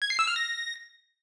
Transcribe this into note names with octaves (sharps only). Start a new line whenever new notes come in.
G#6
C7
E6
F6
A#6